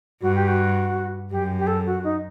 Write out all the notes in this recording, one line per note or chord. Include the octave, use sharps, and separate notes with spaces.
G2 F#4
G4
F#4
F#2 G4
G4
A4
F#4
D#4